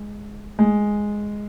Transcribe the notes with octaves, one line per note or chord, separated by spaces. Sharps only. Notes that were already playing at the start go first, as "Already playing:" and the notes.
Already playing: G#3
G#3